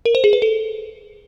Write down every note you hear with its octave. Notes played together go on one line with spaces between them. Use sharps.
A#4
C5
G#4
B4
A4